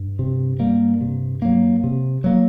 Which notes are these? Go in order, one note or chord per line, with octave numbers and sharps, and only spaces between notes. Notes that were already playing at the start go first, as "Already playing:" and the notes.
Already playing: G2
C3
G3 A#3
C3
F#3 A#3
C3
F#3 A#3